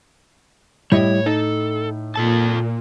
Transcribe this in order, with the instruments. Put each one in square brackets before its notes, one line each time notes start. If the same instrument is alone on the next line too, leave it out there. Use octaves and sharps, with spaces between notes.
[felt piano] A2 [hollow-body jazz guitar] G3 E4 D#5 [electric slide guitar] C#5
[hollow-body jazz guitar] D#4 [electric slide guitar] A4
[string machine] A#2 [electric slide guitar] F4 A4 A5